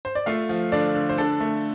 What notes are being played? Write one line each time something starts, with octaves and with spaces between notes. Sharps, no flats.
C5
D5
A3 F4 F5
F3
D3 D4 D5
D3
C5
D4 A4
A3